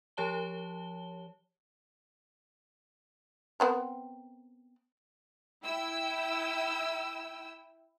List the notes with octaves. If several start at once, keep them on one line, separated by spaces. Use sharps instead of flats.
F3 G4 C#5 A5 G7
B3 C4 A#4
E4 G5 E6